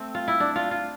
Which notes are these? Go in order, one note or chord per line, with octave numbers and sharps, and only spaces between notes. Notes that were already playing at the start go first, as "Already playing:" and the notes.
Already playing: A3 C4
F4
E4
D4
F4
F4